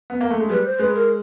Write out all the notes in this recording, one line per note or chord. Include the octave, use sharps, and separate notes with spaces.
B3
A#3
A3
G#3
G3 B4
C5
G#3 B4
A#4